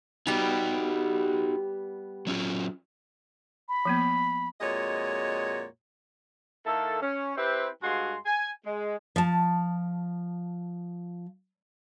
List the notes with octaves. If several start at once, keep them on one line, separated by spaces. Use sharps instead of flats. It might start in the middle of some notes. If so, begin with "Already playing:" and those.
G3 B3 D#4 F#4
F#3 C#4 F4
B5
F3 A#3 B3
F2 A#2 G#3 F#4 C#5 D#5
D#3 A#3 E4 A4
C#4
C4 E4 G4 B4 C5
G2 G#3 F#4 F5 G#5 C6
G#5
G#3
F3 A5